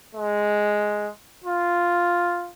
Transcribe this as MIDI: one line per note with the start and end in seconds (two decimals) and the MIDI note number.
0.15 1.08 56
1.44 2.50 65